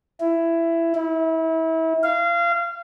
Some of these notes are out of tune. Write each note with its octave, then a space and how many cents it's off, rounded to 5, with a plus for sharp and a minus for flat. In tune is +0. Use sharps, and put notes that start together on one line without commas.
E4 +15
E4 -30
F5 -25